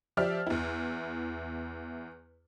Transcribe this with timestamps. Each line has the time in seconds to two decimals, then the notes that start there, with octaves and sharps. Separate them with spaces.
0.17 F3 G4 D5 E5 F6
0.47 E2 E4